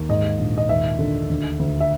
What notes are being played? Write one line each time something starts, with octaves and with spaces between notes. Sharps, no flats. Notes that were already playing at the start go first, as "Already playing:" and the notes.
Already playing: D#2
G#2 D#5
A#1
D#5
D#2 E5
D3
D2
D2
E5